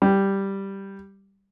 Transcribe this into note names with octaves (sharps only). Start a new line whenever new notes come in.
G3